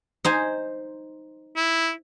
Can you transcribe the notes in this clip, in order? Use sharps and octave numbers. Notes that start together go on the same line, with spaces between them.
D#4 C5 G#5
E4